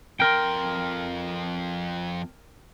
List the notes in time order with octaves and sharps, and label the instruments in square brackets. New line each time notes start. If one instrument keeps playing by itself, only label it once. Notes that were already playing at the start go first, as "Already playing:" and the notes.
[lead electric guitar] F2 C6 [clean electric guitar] A#4 G5